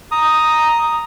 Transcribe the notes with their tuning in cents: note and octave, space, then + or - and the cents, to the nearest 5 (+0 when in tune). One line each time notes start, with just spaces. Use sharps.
A#5 +0 D#6 +0